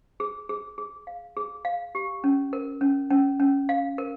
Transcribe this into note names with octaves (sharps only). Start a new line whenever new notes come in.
G#4
G#4
G#4
F5
G#4
F5
G4
C#4
A#4
C#4
C#4
C#4
F5
A#4